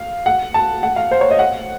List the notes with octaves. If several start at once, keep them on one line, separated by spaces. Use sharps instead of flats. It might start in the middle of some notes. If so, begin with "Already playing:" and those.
Already playing: F5
F#5
A5
F#5
F5
C5
C#5
D#5
F#5